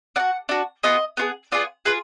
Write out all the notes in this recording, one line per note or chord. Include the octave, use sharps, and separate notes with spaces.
D4 F#4 F#5
D4 F#4
B3 F4 G#4 D#5
B3 F4 G#4
B3 F4 G#4 D5
F4 G#4 B4